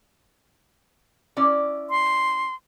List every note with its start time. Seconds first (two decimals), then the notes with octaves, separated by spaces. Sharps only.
1.37 C#4 E4 D5
1.90 C6